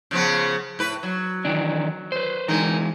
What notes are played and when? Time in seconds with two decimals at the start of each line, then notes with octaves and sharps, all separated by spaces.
0.11 C#3 F3 B3
0.79 A2 B4
1.03 F#3
1.45 D#3 E3 D4
2.12 B4 C5
2.48 D3 E3 G#3 D#4 A#4